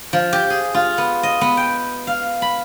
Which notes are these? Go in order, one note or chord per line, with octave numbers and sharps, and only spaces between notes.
F3
G4
G#4
F4
B3
D#5
B3
G5
F5
B5